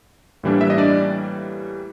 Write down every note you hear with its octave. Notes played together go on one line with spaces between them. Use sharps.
A2 E3 G3 A#3 D4
E5
D#5
D4 D5